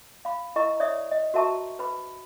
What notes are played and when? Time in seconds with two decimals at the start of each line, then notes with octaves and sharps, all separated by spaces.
0.25 F5 B5
0.56 E4 A#4 D#5 A#5 C#6
0.80 C#5 D5 E5 D#6
1.11 D#5
1.34 F#4 A#4 E5 A5 A#5 C#6
1.79 B4 B5